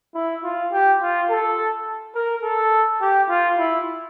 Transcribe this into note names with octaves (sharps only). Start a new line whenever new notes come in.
E4
F4
G4
F4
A4
A#4
A4
G4
F4
E4